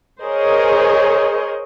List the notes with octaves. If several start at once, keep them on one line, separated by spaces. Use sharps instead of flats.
G#4 A#4 C5 C#5 D#5